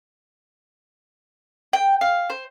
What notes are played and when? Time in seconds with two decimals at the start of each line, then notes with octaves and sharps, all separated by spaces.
1.73 G5
2.01 F5
2.30 C5